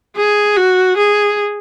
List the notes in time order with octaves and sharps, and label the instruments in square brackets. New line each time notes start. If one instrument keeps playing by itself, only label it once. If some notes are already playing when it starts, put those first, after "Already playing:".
[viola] G#4
F#4
G#4